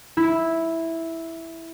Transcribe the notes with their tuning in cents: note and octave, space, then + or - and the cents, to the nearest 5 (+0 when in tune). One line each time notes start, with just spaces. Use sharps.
E4 -5